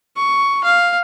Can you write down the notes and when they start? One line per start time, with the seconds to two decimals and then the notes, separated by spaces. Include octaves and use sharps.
0.17 C#6
0.64 F5